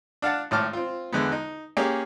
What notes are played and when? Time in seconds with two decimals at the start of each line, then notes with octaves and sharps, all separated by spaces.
0.22 D4 F5 F#5 A5
0.51 G#1 A2 A5 D6 F6
0.73 C4 F4
1.12 E2 D3 G#3 B3
1.32 D#4
1.77 A#3 C#4 G4 G#4